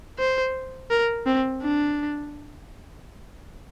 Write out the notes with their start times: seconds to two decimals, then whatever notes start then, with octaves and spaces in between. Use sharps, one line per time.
0.19 C5
0.91 A#4
1.26 C4
1.63 D4